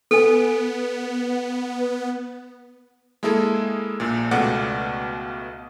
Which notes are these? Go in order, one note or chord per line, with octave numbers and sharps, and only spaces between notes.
B3 A4 G#5
G#3 A#3 E4 G#4 A4
A#1 A#2
C#2 B2 A3 D5 F#5 D6